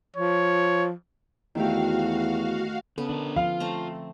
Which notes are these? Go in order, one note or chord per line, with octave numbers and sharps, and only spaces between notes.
F3 C#5
E2 D#3 A3 F#4 G4 F5
C#3 B3 A4
D3 C#4 D4 A#4
F3 F4 F5
A3 C4 A#5